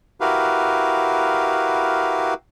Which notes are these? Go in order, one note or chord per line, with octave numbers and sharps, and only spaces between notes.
E4 F#4 G4 A#4 B4 F5